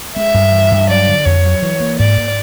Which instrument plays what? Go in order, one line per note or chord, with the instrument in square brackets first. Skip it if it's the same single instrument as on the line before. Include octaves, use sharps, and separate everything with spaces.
[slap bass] G#3 [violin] E5
[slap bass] G2
E3
G2
[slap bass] F#3 [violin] D5
[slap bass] D3
[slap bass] F2 [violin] C#5
[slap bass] F#3
E3
A#3
[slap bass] G#2 [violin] D5
[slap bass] G#2